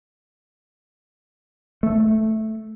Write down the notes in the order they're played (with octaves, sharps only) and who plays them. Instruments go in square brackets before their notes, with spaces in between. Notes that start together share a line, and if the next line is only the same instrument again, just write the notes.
[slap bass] A3